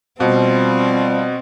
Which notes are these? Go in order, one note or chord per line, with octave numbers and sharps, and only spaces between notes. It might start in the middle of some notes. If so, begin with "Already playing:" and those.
B2 F3 G3 C4